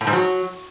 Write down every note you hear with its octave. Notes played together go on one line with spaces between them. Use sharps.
A2
G#2
F#3